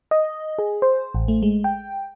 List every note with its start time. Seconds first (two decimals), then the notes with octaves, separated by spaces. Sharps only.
0.11 D#5
0.59 G#4
0.82 C5
1.15 A1
1.28 A3
1.43 G#3
1.64 G5